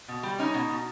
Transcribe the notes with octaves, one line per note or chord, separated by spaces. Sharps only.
B2
G3
C#4 D#4
B2
B2